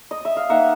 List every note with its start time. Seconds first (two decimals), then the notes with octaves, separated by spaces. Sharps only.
0.11 D#5
0.25 E5
0.37 F5
0.50 A#3 D#4 E5 F#5